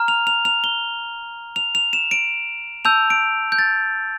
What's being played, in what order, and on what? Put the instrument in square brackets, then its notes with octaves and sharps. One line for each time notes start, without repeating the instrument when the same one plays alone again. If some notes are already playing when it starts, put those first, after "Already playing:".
Already playing: [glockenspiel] A#5 F6
F7
F7
F7
G7
F7
F7
E7
D7
A5 E6 G6 F7
D7
G6
A6